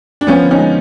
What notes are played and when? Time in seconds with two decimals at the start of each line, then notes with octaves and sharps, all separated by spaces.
0.21 D4
0.27 F3 B3 C#4
0.43 D3
0.51 C#4 D#4
0.58 G#3